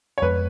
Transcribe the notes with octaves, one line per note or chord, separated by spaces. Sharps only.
C#5
F2 F3 G#3 B3 B4